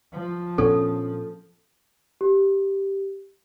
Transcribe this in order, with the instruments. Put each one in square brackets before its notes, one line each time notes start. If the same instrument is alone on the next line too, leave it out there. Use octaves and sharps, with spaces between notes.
[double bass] F3
[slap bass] A#2 B3 D4 [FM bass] C#4 [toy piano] A4
[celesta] G4